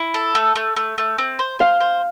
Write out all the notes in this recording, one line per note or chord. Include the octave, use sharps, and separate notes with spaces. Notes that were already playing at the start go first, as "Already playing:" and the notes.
Already playing: E4
A4
A3
A3
A3
A3
C4
C5
C5 F5
C5